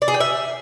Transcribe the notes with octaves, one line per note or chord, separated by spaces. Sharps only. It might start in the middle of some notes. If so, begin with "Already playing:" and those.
D5
G#4
G5
E5